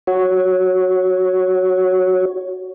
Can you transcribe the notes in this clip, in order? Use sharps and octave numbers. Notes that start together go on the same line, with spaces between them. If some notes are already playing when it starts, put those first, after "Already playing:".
F#4 C#5